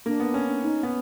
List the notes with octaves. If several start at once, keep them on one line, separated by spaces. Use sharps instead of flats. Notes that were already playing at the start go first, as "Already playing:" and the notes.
A#3 D4
B3
C#4
D#4
B3